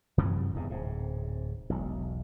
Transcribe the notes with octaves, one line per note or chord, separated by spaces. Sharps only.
F#2 C3 E3 F#3
F#1 E2 G#2 C3
D1 G#2 C3
E1 B1